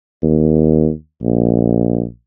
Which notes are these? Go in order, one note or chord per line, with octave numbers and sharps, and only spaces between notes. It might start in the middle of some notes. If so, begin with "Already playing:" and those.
D#2
A#1